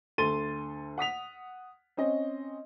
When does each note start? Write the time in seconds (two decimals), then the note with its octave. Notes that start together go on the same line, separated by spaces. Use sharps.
0.18 D2 A4 C6 A6 D#7 G7
0.98 F#5 D#6 B6 F7
1.97 C4 C#4 D#5